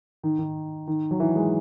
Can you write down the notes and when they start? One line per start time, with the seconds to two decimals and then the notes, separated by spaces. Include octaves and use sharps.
0.23 D#3
0.39 D#3
0.87 D#3
1.11 F#3
1.20 E3
1.36 G#3